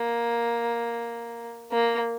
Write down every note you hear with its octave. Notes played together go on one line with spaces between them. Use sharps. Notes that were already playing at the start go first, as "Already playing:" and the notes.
Already playing: A#3
A#3